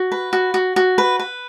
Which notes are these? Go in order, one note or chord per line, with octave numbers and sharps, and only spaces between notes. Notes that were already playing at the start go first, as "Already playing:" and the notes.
Already playing: F#4
B4
F#4
F#4
F#4
B4
B4